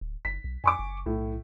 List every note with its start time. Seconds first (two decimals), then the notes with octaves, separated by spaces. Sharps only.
0.01 D1
0.25 F#1 B6
0.44 B1
0.64 F2 G#5 C#6 D6
0.79 F#1
1.06 B1 A2